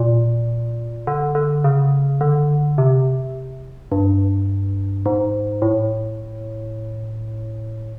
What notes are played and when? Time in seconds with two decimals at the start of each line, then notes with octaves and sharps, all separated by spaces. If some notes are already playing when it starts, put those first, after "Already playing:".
Already playing: A#2
1.07 D3
1.35 D3
1.64 C#3
2.21 D3
2.78 C3
3.92 G2
5.06 G#2
5.62 A2